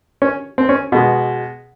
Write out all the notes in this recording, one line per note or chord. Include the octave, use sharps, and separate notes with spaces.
C#4
C4
C#4
B2 G#3